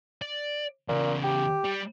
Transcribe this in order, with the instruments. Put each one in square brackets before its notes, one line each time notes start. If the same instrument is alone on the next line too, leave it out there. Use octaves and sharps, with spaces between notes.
[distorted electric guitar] D5
[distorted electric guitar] E2 C#3 [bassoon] A#2
[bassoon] G4
[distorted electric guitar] G3